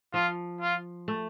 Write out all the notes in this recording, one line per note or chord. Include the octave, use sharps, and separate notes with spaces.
F3 F4
F4
A3